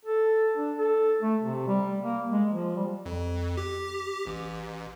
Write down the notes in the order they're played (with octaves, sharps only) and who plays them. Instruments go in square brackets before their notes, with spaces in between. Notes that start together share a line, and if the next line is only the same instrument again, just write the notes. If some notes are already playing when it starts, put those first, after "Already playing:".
[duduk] A4
D4
A4
A3
C3
G3
A#3
G#3
F3
G3
[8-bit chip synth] F2
G4
A1